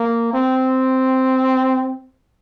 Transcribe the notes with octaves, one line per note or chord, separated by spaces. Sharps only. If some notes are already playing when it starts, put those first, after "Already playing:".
Already playing: A#3
C4